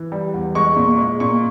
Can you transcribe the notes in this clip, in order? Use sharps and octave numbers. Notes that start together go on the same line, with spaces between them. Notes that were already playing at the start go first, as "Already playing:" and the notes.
Already playing: E3
G3
E2
G#3 C#6
A#2
G#3
A#2 C#6